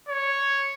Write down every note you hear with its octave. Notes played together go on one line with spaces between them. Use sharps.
C#5